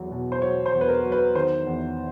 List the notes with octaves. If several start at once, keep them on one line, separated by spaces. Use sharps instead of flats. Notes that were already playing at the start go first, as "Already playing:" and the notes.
Already playing: E2 F#3
B2
C5
F#3 C#5
C5
E2
B4
A#4
F#3
B4
D#3 C5
E2